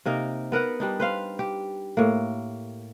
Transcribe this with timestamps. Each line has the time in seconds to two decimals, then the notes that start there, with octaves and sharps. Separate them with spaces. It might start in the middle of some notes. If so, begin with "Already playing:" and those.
0.05 C3 A#3 D#4 A#4
0.52 B3 A#4 B4 F#5
0.80 G3 D4 D#4
1.00 B4 C5 F5
1.39 G4
1.97 A2 A#3